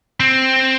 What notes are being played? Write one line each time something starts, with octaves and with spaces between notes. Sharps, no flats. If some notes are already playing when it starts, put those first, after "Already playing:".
C4